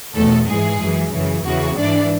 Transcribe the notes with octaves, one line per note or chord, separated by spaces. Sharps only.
E2 B2 A3 A4
G#2 E3 G#3 G#4
F#2 E3
F#2 C#3 E3
E2 C#3 E3 F#4
G#2 E3 D4 D5